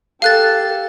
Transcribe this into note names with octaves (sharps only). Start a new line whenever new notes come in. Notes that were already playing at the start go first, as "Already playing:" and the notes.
G4 A4 F5 F#6 A6